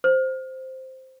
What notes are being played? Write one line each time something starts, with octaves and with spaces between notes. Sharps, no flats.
C5